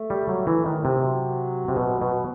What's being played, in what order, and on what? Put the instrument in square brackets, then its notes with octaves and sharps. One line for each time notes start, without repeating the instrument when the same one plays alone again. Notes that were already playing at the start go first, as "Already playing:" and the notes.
Already playing: [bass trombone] A3
[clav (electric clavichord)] G3
F#3
E3
D#3
C3
[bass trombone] F#3
[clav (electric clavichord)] C3
B2
B2